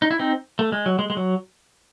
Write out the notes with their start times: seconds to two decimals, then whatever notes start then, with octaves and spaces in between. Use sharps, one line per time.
0.02 D#4
0.11 E4
0.19 C4 D#4
0.59 A3
0.72 G#3
0.86 F#3
0.99 G#3
1.10 G#3
1.17 F#3